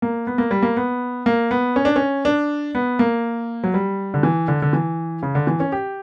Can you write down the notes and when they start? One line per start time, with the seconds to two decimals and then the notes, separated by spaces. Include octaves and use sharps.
0.02 A#3
0.27 B3
0.38 A#3
0.51 G3
0.62 A#3
0.77 B3
1.26 A#3
1.51 B3
1.76 C#4
1.85 D4
1.96 C#4
2.25 D4
2.75 B3
2.99 A#3
3.64 F#3
3.74 G3
4.14 D3
4.23 E3
4.48 D3
4.62 D3
4.73 E3
5.23 C#3
5.35 D3
5.47 E3
5.60 C#4
5.72 G4